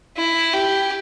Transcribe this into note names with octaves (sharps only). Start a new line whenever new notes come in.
E4
G4